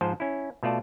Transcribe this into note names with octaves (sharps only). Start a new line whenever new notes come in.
G#2 F3 C5 A5
C#4 E4
B2 A3 F4 D5 A5